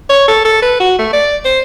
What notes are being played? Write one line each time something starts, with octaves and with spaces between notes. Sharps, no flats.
C#5
A4
A4
B4
F#4
A3
D5
C5